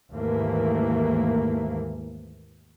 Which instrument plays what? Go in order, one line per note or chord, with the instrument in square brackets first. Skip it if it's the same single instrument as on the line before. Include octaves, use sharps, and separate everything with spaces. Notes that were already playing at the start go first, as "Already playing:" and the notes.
[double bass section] D#2 G#2 E3 A3 A#3